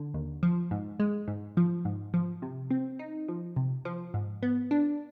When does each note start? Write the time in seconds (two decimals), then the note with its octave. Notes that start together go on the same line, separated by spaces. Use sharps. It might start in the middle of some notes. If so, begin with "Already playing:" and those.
Already playing: D3
0.14 D#2
0.43 F3
0.71 G#2
1.00 G#3
1.28 G#2
1.57 F3
1.85 G#2
2.14 F3
2.42 C3
2.71 C4
2.99 D#4
3.28 F3
3.56 C3
3.85 F3
4.14 G#2
4.43 B3
4.71 D4